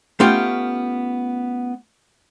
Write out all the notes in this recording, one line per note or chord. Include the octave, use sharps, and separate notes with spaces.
A3 B3 C#4 F4 G4